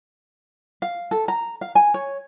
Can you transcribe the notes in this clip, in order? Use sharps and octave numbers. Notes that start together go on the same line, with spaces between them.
F5
A4
A#5
F5
G#5
C#5